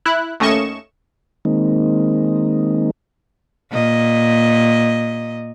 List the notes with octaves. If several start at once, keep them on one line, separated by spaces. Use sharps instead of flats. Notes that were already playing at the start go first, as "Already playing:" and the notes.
E4 F#6
D#2 A3 C#4 D#5 C#6 E7
D#3 G#3 A#3 C4 D#4
A#2 D#5